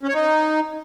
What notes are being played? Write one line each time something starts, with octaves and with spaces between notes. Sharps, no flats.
C#4
C#5
D#4